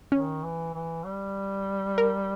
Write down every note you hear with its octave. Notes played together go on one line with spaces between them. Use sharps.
D#3 C#4
E3
E3
G3
A#4